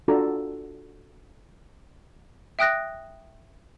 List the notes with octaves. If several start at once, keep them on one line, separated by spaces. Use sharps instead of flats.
D4 F4 F#4 A4 A#5
E5 G5 D#6 F#6 A#6